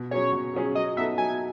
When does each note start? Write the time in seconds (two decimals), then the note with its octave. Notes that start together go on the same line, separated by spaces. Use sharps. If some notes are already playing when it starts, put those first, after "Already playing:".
Already playing: B2
0.11 F#3 C#4 G#4 C#5
0.33 B2
0.54 F#3 C#4 G#4
0.75 F#3 D#5
0.96 B3 D#4 A4 E5
1.18 F#3 G#5